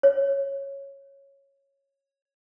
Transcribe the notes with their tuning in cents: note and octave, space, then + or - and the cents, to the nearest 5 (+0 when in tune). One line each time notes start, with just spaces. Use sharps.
C#5 -5